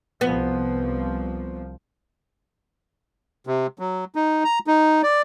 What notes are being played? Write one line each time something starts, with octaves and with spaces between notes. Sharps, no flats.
C2 F3 B3
C3
F#3
D#4
A#5
D#4
D5